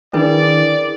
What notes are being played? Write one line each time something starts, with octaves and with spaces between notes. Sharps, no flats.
D#3 C#4 D4 E4 G#4 A#4 B4 D5